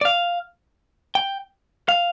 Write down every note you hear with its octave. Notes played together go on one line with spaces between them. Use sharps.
D5
F5
G5
F5